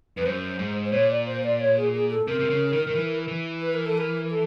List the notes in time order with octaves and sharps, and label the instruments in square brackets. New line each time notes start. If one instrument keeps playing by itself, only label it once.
[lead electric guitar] F2 [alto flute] B4
[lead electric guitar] F#2 [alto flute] C5
[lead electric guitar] G#2
[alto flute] C5
[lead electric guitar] A#2 [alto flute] C#5
[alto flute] D5
C5
D5
C#5
G#4
G#4
A4
[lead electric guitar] C3 [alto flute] A#4
[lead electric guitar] C3
C#3
D#3
D#3
E3
E3
[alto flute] B4
A#4
A4
A#4
A4